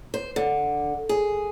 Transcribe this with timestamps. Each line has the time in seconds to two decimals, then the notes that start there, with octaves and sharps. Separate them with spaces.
0.14 C5
0.36 D3
1.09 G#4